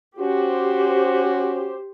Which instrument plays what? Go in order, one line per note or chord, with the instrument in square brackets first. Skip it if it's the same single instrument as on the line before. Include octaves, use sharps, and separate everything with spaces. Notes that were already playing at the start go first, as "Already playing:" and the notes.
[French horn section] C#4 F#4 [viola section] G4 C5